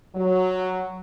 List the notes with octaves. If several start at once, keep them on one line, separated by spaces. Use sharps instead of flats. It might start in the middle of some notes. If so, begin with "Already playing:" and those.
F#3